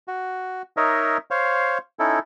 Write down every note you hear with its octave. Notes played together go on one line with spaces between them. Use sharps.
F#4
D#4 A#4 C#5 D#5 E5
C5 C#5 F5
C#4 D#4 E4 A4